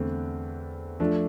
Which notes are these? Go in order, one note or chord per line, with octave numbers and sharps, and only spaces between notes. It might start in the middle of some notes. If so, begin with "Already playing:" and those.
Already playing: E2 D3 A3 C4
F3 A3 D4